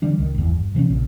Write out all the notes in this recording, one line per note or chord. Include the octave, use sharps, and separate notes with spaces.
D3 E3 G3 D4
C#2 D#3
G#1 E2
G2
C3 E3 A#3 C#4
A#1 A#2 C#3